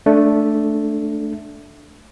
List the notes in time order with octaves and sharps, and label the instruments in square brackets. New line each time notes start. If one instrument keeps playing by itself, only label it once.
[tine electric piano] A3 D4